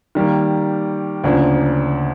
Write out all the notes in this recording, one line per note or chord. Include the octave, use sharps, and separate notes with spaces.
D#3 G3 A#3
D2 C#3 F3 A#3 D4